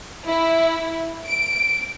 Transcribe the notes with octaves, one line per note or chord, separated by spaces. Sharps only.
E4
D7